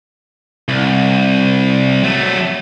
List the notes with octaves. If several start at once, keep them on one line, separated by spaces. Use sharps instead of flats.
C2
F#3 A3